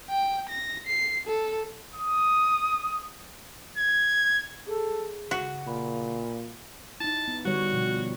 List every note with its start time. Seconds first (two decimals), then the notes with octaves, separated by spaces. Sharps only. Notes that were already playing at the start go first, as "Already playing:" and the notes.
0.10 G5
0.49 A#6
0.87 C7
1.28 A4
1.93 D#6
3.78 G#6
4.67 G#4 A4
5.31 C#3 F#4
5.67 A#2 B5
7.00 D#4 E4 A5
7.28 B3
7.45 D3 G3 F#4 C#5
7.73 B2 F3